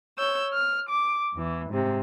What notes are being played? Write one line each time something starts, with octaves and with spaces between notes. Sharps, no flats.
C#5 E6 G6
F6
D6
E2 E3
G#2 C3